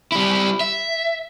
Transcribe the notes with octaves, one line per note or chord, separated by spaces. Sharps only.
G3 E4
E5